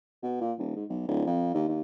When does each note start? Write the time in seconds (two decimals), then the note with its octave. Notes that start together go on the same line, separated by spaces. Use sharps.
0.23 B2
0.41 A#2
0.58 D#1
0.76 G#2
0.89 B1
1.08 D1
1.26 F2
1.54 D#2
1.68 D#2